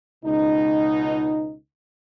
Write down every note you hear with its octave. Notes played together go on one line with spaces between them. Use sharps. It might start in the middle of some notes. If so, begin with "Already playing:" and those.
C#2 B2 D#4